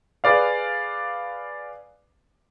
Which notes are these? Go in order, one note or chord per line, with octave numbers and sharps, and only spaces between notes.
G#4 B4 D5 F5